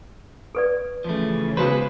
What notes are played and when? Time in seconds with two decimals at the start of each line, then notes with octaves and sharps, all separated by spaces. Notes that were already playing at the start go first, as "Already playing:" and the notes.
0.55 A4 B4 D5
1.04 C#3 E3 F3 A3
1.57 C#2 F#3 G#3 B3 B4 C5